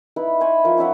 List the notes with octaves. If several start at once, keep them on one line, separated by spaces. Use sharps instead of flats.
D#4 E4 B4 B5
C5 G#5 B5 C#6
F3 A#4
C#4 D#4 E5 F#5